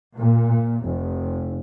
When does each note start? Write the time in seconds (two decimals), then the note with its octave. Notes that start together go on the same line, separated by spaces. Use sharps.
0.18 A#2
0.81 F1